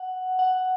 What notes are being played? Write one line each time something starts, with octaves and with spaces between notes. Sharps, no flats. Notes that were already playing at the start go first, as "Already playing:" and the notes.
Already playing: F#5
F#5